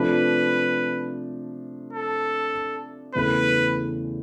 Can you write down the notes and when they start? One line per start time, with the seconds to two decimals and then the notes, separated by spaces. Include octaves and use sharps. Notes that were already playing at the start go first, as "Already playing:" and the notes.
Already playing: C3 F3 A3 D4 F4 B4
1.93 A4
3.14 E2 C#3 E3 A3 B4